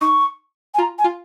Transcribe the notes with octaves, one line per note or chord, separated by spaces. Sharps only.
D#4 C#6
G#5
F4 A#5
G#5
F4